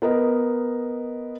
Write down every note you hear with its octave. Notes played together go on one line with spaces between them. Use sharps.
B3 A#4 D#5